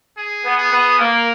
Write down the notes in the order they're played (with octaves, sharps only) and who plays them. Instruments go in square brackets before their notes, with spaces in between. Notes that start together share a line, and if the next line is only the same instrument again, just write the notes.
[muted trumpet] G#4
[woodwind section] B3
[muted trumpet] G#4
[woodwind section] B3
[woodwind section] A#3 [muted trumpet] A#4